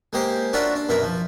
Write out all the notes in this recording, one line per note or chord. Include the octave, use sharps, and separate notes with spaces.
G#3 A#3 G4 C5
D4 F4 F#4 A#4 C#5 E5
D4
F#2 B2 A#4 E5
F3